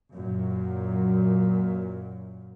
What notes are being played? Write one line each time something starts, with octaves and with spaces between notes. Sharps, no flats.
F#2 A#2